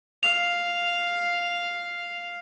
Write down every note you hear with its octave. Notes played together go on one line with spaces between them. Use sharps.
F5 F7